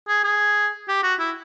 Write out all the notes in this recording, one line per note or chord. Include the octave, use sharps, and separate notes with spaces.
G#4
G#4
G4
F#4
E4